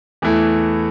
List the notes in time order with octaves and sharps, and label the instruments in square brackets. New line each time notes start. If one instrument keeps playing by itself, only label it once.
[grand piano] E2 E3 A3 E4